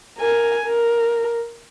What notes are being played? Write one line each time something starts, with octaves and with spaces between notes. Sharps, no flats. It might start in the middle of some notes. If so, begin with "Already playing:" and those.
A#4 G#5
A#4